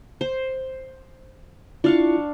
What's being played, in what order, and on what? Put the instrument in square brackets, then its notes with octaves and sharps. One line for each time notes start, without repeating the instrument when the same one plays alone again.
[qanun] C5
[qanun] D4 F5 C#6 [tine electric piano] E4 F4